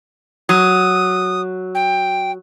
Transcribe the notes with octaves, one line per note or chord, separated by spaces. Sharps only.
F#3 D#6
G5